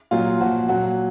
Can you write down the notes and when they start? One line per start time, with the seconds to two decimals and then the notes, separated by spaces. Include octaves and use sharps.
0.11 A#2 F#3 F4
0.40 A#2 F3 F#4
0.68 A#2 F#3 F#4